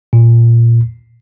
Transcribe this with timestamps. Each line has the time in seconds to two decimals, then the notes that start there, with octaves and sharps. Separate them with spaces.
0.13 A#2